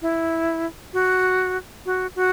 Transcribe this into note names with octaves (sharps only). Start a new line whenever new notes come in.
E4
F#4
F#4
F#4